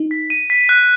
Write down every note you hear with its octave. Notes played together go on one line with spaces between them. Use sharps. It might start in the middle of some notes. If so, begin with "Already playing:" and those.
Already playing: D#4
B6
D#7
B6
F#6